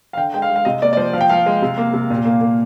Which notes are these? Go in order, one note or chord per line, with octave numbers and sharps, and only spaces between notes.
F5
D3 G5
G#3 G5
F5
G#3
F5
C3 D#5
A#3 D5
D5
F3 C5
F3 F5
G5
F3 F5
G#3
C3
A#3
C3
A#2
A#3
A#3